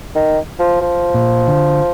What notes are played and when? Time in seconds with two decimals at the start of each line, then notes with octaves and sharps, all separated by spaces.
0.16 D#3
0.59 F3
0.81 F3
1.14 A#2
1.48 D3